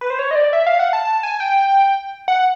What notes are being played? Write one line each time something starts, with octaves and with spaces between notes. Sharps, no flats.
B4
C5
C#5
D#5
D5
E5
F5
F#5
A5
A5
G#5
G5
F#5